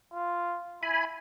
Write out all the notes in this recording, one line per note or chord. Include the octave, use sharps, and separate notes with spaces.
F4
E4 G#5 B5